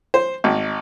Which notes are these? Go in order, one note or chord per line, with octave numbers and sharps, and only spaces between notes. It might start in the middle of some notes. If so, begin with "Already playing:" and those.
C5
G#1